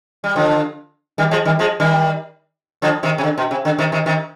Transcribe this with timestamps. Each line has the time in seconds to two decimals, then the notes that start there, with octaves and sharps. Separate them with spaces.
0.24 G3
0.36 D3 F3
1.18 D#3 G3
1.31 F3 G#3
1.45 D#3 G3
1.59 F3 G#3
1.80 D#3 G3
2.82 D3 F3
3.03 C3 D#3
3.18 C3
3.24 D3
3.38 B2
3.51 C3
3.65 D3
3.78 C3 D#3
3.92 C3 D#3
4.06 C3 D#3